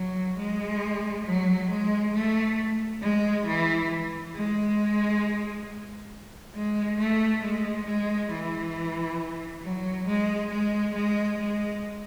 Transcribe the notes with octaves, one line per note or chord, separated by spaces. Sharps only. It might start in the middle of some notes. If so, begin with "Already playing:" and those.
Already playing: F#3
G#3
F#3
G#3
A3
G#3
E3
G#3
G#3
A3
G#3
G#3
E3
F#3
G#3
G#3
G#3
G#3